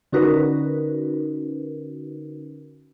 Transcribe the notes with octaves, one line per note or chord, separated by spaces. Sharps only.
D3 C#4 D#4 F#4 A#4 B4